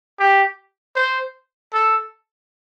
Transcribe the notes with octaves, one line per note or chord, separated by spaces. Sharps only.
G4
C5
A4